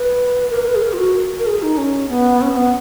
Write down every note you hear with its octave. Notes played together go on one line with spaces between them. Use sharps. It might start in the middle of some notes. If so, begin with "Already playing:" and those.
Already playing: B4
A#4
A#4
B4
G#4
A#4
F4
F#4
A#4
G#4
D#4
C#4
B3
C#4
C#4
B3